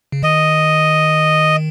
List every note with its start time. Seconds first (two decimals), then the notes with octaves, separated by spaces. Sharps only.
0.12 C#3
0.22 D#3 D#5